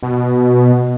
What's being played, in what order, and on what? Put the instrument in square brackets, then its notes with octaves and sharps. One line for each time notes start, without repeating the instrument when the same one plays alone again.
[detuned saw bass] B2